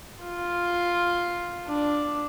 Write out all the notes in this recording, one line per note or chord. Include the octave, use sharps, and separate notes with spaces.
F4
D4